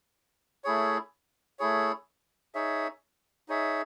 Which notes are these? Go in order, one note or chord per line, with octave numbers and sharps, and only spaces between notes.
A3 E4 G#4 C#5
A3 E4 G#4 C#5
D#4 G#4 C#5 E5
D#4 G#4 C#5 E5